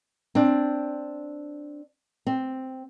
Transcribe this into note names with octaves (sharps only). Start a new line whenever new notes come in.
C4 D4
C4